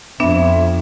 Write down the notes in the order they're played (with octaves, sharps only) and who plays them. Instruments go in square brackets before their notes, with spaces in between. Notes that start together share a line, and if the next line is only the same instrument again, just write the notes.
[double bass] F2 [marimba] B3 D4 [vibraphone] E5